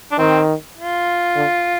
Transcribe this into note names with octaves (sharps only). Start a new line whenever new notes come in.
D4
D#3 C4
F4
D3